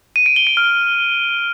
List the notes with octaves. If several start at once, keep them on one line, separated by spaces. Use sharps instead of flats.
D#7
D7
G7
D7
F6